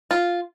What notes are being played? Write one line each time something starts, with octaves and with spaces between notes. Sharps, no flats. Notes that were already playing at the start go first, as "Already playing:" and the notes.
F4